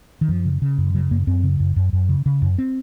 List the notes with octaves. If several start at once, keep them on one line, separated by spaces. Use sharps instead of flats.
D#3
F#2 F3
C#3
C#3
F#2
C#3 F#3
F#2 A#3
F#2 C4
C#3
F#2
F#2
F#2
C#3
C#3
F#2
C4